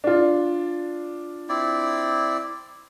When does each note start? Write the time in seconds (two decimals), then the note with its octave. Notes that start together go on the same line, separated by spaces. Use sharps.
0.04 D4 F4
1.49 C4 E4 D5